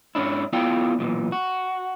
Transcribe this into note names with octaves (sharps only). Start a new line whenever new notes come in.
G#2 C#4 D4 E4
B3 E4 F4 A4 D5 G5
B1 A#2 D#3 E3
F#4